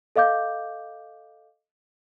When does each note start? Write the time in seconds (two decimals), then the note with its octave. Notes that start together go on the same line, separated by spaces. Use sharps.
0.16 A4 D#5 F5 D6 G6